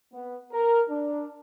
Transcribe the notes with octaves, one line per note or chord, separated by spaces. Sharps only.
B3
A#4
D4